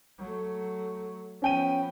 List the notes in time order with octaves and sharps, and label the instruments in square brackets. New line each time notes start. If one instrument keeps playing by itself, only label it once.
[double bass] F#3 A3
[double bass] F3 B3 [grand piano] C#4 G5 D#7